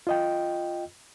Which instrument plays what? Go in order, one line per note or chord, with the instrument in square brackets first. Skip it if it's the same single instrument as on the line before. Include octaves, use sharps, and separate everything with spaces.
[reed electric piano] F4 D#5 G5